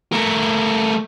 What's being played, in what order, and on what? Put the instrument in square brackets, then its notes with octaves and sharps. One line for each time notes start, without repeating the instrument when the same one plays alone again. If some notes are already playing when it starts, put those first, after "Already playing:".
[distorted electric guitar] A3 A#4